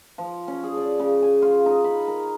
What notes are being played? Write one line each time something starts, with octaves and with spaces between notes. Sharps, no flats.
F3
C#4
G#4
D5
C#3
G#5
F4
D#4
B5
A#4